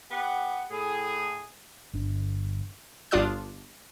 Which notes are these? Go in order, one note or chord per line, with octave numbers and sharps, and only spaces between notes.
B3 G4 F#5
A2 G#4
G1 D4
G1 D4 F4 D5 D#6 F#6